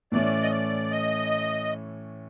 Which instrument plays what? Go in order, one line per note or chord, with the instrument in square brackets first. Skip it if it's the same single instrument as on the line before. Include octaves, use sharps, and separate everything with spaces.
[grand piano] A2 E3 A3 C#4 [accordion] D5
[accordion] D#5
D5
D#5